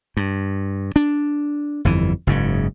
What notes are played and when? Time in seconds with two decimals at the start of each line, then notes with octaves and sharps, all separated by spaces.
0.17 G2
0.96 D4
1.85 G1 F2 E3
2.27 F#1 G#2 C#3